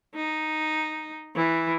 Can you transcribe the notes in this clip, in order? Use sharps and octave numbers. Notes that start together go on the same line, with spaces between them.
D#4
E3